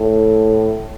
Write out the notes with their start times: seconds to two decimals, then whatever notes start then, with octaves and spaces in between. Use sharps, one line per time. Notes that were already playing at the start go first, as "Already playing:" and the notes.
Already playing: A2